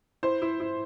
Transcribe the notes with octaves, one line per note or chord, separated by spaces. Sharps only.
E4 C5
E4
E4